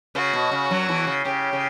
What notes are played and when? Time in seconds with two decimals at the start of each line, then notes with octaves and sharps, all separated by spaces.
0.15 C#3 F#4
0.33 B2
0.52 C#3
0.71 F#2 F#3
0.89 E2 E3
1.07 C#3
1.25 C#3 G4
1.53 C#3